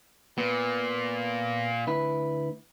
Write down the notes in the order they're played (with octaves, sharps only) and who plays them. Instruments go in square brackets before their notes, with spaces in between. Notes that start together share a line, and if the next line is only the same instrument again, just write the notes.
[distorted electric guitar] A#2 [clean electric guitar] B3
[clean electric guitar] D2 E4 B4